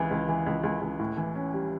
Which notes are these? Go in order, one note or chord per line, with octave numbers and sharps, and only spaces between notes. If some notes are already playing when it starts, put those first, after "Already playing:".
Already playing: C#2 C#3 E3
C#2
E3
C#2
C#2
C#2
A2
E3
C#4
G3